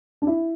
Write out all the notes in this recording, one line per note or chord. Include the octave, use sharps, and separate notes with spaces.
D4
E4